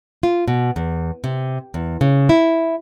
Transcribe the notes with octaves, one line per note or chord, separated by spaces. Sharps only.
F4
B2
E2
C3
E2
C#3
E4